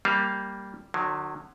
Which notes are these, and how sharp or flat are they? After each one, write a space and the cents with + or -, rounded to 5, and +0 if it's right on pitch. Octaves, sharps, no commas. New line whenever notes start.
G3 +0 A#3 -5 F5 +0
D3 +40 F#3 -15